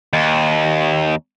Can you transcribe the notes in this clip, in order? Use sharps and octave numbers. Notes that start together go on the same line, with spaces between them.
D#2